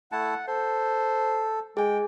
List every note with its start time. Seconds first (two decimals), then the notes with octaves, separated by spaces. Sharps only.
0.12 A3 E4 F#5 A5
0.48 A4 C5
1.77 G#3 G#4 G5 G#5